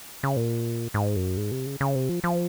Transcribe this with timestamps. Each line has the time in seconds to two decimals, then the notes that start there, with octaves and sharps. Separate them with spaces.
0.23 C#3
0.37 A#2
0.94 G#2
1.16 F#2
1.37 G#2
1.52 C3
1.66 C#3
1.81 C#3
1.95 C3
2.09 F3
2.24 F3